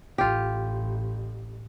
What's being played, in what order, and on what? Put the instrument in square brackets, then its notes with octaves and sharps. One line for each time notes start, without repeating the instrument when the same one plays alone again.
[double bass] A1 [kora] F4 G4